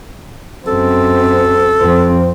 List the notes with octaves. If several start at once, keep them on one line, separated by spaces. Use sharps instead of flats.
F#2 C4 A4
F2 C4